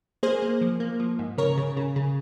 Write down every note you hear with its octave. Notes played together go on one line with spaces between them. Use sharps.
A#3 G#4 C5
A#3
F3
A#3
F3
G#2
C#3 A#4 C#5
C#3
C#3
C#3